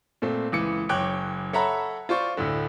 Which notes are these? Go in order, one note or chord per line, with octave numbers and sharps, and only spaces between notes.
A#2 A3 C4
C#2 E3 D6 C#7
F#1 C#5 G5 D6 F#6
A4 C#5 E5 F#5 A#5 B5
F4 C5 D5 C#6
D2 A2 D3